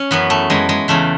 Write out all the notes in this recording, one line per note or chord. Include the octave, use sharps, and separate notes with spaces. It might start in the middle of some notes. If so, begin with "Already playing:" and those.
Already playing: C#4
F#2 E3 B3
A3
F#2 E3 G#3
G#3
E2 C#3 E3 A3